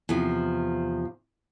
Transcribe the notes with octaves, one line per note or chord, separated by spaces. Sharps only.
E2 C3 F3